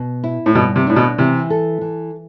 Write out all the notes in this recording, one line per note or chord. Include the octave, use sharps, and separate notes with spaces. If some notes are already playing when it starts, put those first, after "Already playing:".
Already playing: B2
E4
A2
G2 B2
C3
A2 D4
B2
C3 E3
A4
E3